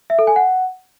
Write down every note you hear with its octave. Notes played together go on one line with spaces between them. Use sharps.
E5
A4
G#5
F#5